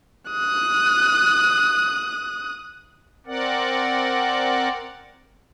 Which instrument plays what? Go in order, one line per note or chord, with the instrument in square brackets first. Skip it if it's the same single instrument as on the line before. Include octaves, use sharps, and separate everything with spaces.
[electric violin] D#6 F#6
[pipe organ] C4 A#4 D5 F#5